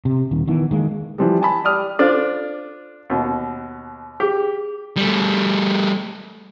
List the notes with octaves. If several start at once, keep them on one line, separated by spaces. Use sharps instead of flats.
C3
D#1 D#3
D#3 E3 B3
D#3 G#3 A#3
E3 F3 G3
G#5 A5 B5
G4 D5 D#6 F6
D4 F4 A4 C5 D5
D#2 B2
G4 G#4
G3 A3